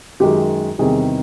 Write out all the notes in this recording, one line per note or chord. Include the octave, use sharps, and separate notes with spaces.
F#2 D#3 G#3 G4
E2 C3 D#3 G3 G#4